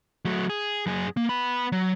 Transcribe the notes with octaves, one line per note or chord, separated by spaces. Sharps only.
F#3 A3
G#4
F#2 G#4
A#3
B3 B5
F#3